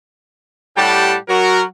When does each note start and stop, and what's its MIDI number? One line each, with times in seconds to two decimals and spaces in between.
0.78 1.16 45
0.78 1.16 55
0.78 1.16 67
0.78 1.16 78
0.78 1.16 79
0.78 1.16 81
1.29 1.64 54
1.29 1.64 66
1.29 1.64 70